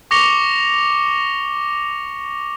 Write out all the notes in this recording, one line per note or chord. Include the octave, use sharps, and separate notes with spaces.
C#6 D6 A#6 C#7 F7 G7